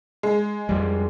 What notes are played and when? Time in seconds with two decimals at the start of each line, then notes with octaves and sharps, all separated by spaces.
0.23 G#3
0.69 F2 G3